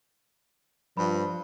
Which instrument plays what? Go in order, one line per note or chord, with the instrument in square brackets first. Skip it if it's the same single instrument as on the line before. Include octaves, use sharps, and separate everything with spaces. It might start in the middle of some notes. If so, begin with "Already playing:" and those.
[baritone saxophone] G2 [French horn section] F3 [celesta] B5